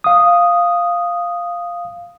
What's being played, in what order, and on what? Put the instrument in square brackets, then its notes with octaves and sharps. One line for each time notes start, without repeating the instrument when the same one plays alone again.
[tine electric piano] F5 D#6